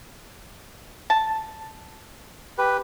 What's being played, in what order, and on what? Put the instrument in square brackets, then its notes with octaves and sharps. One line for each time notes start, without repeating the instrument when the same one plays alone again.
[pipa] A5
[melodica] G4 B4